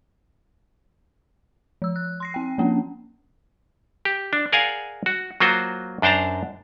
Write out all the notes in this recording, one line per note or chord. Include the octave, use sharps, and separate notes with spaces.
F3 E6
F#6
C6 A#6 C7
C4 G5
F3 A#3 C#4 D4
G4
D4
G#4 A#4 D5 F5 F#5 G#5
F#4
F#3 A#3 F4 F#4 C5
F#2 D4 C5 D5 A5 A#5